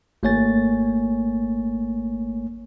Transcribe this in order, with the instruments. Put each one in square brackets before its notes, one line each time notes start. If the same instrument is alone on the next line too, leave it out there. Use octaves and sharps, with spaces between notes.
[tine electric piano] G#1 A3 A#3 C#5 G#5 A6